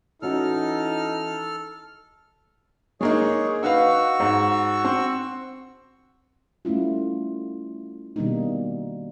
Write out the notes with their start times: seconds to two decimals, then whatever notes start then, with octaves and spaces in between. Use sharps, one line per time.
0.22 E3 C#4 D#4 F#4 A4 F6
3.01 G#3 A#3 D#4 G#4 C#5
3.63 D#4 F#4 B4 F5 C#6 E6
4.20 G#2
4.85 C4
6.65 G3 A3 C#4 E4 F4
8.16 B2 D#3 G3 A#3 D4 D#4